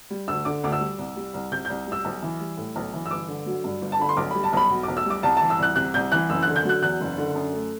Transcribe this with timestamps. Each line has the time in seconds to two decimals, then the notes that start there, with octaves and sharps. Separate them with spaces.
0.10 G3
0.28 D2 E6
0.45 D3 D6
0.63 D2 D6
0.72 E6
0.81 G3
0.99 C2
1.16 G3
1.34 C2
1.52 C3 G6
1.65 C2 G6
1.87 G3
1.92 E6
2.05 B1
2.22 E3
2.40 G3
2.57 A2
2.76 B1
2.94 E3
3.06 E6
3.11 G1 D6
3.28 D3
3.46 F#3
3.64 G2
3.81 G1
3.92 A5
3.99 D3 B5
4.09 C6
4.17 B1 D6
4.31 G3 B5
4.44 A5
4.53 B1 B5
4.70 B2
4.83 D6
4.88 B1
4.97 E6
5.06 G3 D6
5.23 C2 A5
5.37 E3 A5
5.50 E6
5.59 C2 F#6
5.76 C3 F#6
5.94 C2 G6
6.12 E3 F#6
6.30 F#1 E6
6.43 D3 F#6
6.56 G6
6.65 F#3 F#6
6.82 E2 F#6
7.00 F#1
7.18 D3
7.35 F#2
7.53 A3